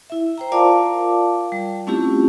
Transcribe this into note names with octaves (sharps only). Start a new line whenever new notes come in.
E4 E5
C5 G5 A#5
F4 A#4 D5 F5 A5 D6
G3
A3 C4 C#4 E4 F4 G4